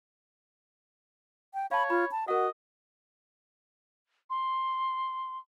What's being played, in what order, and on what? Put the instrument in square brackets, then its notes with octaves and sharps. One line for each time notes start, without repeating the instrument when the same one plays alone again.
[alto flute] G5
[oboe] C#5 [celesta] F5 A5 [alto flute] B5
[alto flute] F4 [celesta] B5
[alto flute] A5
[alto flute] F#4 [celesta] A#4 F#5 [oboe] D#5
[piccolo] C6